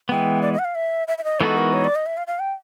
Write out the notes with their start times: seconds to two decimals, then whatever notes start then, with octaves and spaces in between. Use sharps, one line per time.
0.09 E3 G#3 B3 G5
0.42 D5
0.53 D#5
0.59 F#5
0.65 F5
0.75 E5
1.08 E5
1.18 E5
1.24 D#5
1.40 E3 G#3 B3 D#4 F#4 A4
1.57 A#4
1.73 C#5
1.84 D5
1.95 D#5
2.06 E5
2.17 F5
2.27 F5
2.39 G5